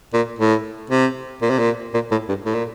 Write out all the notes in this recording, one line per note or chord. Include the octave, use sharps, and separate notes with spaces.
A#2
A2
C3
A#2
C3
A#2
A#2
A2
G2
A2
A#2